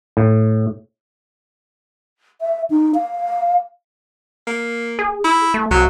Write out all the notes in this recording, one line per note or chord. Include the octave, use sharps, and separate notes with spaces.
A2
E5
D#4
F5
A#3
G#4
E4
A3
C2 F#3